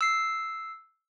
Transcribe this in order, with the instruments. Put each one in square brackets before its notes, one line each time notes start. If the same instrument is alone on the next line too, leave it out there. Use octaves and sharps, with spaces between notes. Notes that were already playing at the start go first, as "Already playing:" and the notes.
[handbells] E6 C7